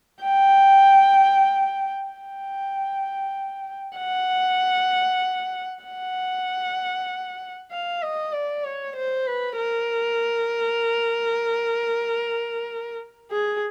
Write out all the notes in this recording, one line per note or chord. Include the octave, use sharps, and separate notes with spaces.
G5
G5
F#5
F#5
F5
D#5
D5
C#5
C5
B4
A#4
G#4